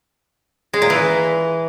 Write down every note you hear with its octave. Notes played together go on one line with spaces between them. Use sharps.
G#3
A#2
E3